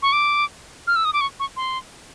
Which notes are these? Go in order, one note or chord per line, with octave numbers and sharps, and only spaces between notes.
C#6
D6
F6
E6
D#6
D6
C#6
C#6
C6